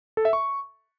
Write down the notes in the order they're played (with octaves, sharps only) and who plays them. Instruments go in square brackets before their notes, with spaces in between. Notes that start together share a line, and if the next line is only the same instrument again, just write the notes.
[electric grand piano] A4
E5
C#6